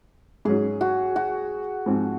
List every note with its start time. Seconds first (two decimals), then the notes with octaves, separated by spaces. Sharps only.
0.45 G#2 F#3 C#4 G#4
0.81 F#4
1.16 F#4
1.86 G#2 F3 C4